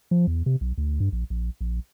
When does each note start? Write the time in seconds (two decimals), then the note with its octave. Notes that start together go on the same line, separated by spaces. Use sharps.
0.11 F3
0.27 E2
0.46 C3
0.61 B1
0.78 D2
1.00 G2
1.12 A#1
1.30 A#1
1.61 A#1